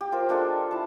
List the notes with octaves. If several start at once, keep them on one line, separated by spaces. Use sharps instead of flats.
G4
F4 A#4 C5
G#3 D4 F4 A4
E4 A5